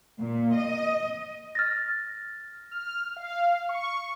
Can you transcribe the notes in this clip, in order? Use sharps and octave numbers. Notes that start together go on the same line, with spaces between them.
A#2
D#5
F6 A6 A#6
F6
F5
C#6